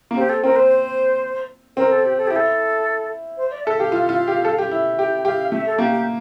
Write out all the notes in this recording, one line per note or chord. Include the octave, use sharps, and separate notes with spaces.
A#3
C4 G4
A4
C4 A#4
C5
C4 A#4
A4
G4
A4
E4 G4
A4
C5
D5
A4 E5
G4 F5
F4
F4
G4
A4
G4
E4
G4 G5
G4 F5
A3 E5
A4
A#3 G4
G4